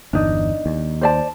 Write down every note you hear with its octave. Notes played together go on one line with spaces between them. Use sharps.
G1 E2 D4 D#4
D#2
C5 D5 A5